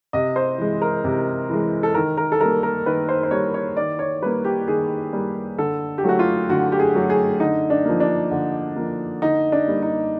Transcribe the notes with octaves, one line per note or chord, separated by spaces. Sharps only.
C3 D#5
C5
E3 G#3
A#4
C3
E3 G#3
A4
D#3 A#4
A#4
A4
G3 A#3 A#4
A#4
D#3 B4
C5
C5
G3 A#3 C#5
C#5
D#3 D5
C#5
G3 A#3 B4
G4
D#3 G#4
G3 A#3
D3 A4
G4
F#3 A3 F#4
F4
D3 F#4
G4
G#4
F#3 A3
G#4
D3 D#4
D4
F3 A#3
D4
D3
F3 A#3
D3 D#4
D4
G3 A#3
D#4